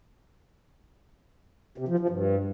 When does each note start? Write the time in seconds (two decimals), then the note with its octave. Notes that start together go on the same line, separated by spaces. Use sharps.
1.78 C3
1.88 F3
1.99 F3
2.09 G2